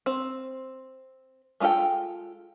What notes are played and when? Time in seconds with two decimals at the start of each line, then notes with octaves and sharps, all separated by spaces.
0.06 C4
1.60 G#3 A3 F4 A4 G5